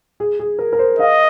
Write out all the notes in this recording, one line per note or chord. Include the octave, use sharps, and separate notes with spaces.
G#4
G#4
A#4
A#4
C5
D#5 F5